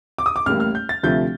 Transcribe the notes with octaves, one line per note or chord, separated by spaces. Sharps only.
D6
D#6
D6
A1 A2 G3 A#3 F6
F6
G6
A6
D2 C3 F3 A3 G6